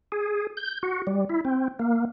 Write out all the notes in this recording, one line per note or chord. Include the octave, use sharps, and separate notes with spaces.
G#4
G6
F#4
G3
E4
C4
A#3